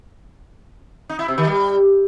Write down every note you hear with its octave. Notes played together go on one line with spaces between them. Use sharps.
D#4
E4
C3
D#3
G3